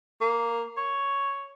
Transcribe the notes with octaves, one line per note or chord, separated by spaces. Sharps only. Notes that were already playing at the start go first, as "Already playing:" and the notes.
A#3
C#5